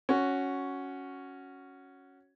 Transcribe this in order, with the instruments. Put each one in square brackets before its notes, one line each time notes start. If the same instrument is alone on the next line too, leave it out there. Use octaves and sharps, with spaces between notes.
[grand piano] C#4 F#4